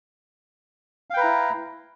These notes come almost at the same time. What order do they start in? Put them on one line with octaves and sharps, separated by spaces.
F5 G5 B4 A#5 E4